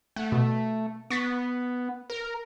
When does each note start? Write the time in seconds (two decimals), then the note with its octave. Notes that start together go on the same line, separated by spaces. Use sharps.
0.16 A3 F#5
0.32 B2
1.10 B3 C#6 A6 B6
2.10 A#4